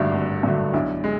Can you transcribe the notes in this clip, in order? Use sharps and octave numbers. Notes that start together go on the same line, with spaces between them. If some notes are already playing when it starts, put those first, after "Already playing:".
Already playing: G#1 G2 D3 F#3 A3 D4
G#1
G2 D3 F#3 A3
B1 D4 E4
G#3